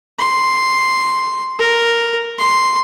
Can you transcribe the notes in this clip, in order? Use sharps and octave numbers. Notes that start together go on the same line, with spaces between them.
C6
A#4
C6